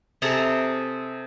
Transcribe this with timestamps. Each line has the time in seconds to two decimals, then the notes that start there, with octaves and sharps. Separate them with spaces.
0.22 C3 G#4 A4 A#5